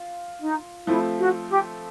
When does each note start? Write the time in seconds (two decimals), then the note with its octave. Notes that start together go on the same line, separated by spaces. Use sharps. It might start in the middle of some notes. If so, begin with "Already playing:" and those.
Already playing: F4
0.40 D#4
0.87 F3 A3 C4 E4
1.19 F#4
1.49 G4